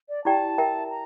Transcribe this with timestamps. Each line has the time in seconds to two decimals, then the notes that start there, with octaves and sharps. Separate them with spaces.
0.09 D5
0.25 E4 G4 D5 G5 A5
0.58 A#4 E5 G5 A#5
0.90 A#5